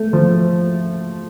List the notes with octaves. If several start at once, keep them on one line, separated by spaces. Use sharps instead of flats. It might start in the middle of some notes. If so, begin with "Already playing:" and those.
Already playing: A3
F3